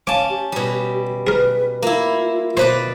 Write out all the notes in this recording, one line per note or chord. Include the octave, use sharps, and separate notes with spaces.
C#4 F5 A5 D6
G4
B2 G3
G#4 A#4 B4
A#3 E4 F4
B2 B4 C5 D5